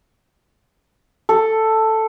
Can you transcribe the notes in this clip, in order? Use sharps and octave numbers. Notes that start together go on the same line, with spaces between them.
A4